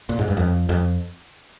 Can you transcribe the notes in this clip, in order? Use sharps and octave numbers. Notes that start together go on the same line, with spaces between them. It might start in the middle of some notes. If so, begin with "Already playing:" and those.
A#2
G#2
G2
F2
F2